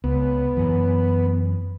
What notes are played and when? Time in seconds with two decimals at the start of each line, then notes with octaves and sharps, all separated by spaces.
0.04 C#2 B3
0.57 F#2 E3